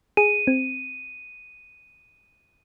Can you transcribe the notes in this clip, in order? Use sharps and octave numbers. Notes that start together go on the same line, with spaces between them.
G#4 D#7
C4